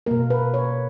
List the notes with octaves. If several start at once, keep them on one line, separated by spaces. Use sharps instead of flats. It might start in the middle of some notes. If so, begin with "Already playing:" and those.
B2 A#3 A#4
B4
C#5